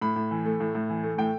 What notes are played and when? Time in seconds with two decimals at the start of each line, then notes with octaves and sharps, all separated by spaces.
0.02 A2 B5
0.16 A2
0.31 E3
0.45 A3
0.60 A2
0.75 A2
0.90 E3
1.03 A3
1.18 A2 G5